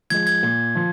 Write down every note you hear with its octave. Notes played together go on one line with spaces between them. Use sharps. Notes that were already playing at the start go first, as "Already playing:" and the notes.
F3 G#3 G#6
G#6
A#2
F3